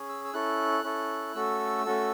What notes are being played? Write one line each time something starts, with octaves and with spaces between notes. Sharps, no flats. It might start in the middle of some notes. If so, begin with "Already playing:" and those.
Already playing: C#4 G#4
E6
E6
C#4 E4 A4 F#6
C#4 E4 A4
A3 C#4 F#4 A4 E6
A3 C#4 F#4 A4